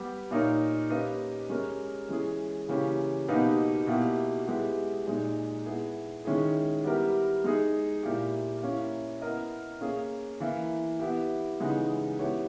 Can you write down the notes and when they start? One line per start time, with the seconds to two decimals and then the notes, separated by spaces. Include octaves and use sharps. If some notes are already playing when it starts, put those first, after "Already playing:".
Already playing: G3 B3 G4
0.31 A#2 A#3 D#4 A#4 C#5
0.90 A#3 C#4 G4 B4 D#5
1.49 G#3 C#4 G4 A#4
2.09 E3 G#3 C#4 G#4
2.68 C#3 E3 A#3 C#4 G4
3.28 B2 A#3 D#4 G4 B4
3.87 B2 A#3 E4 G4
4.47 G#3 B3 E4 G4
5.06 A#2 G#3 D#4 G#4
5.65 B3 E4 G#4
6.25 D#3 G#3 C#4 E4 G#4
6.84 G3 B3 E4 G4 A#4
7.44 G#3 D#4 G#4
8.03 A#2 A#3 E4 G4
8.63 A#3 C#4 E4
9.21 B3 E4 A#4 D#5
9.81 A#3 C#4 G#4
10.40 E3 A#3 E4
11.00 B3 E4 G4
11.60 C#3 E3 G#3 B3 D#4
12.19 B3 E4 G4 C#5